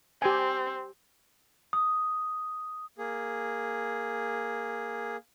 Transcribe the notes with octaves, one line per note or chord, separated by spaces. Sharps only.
C4 G4 G#5
D#6
A#3 G#4